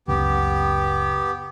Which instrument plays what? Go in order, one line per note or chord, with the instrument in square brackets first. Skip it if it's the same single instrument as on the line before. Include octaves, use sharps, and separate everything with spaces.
[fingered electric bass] F#1 C#2 [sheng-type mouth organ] B3 G4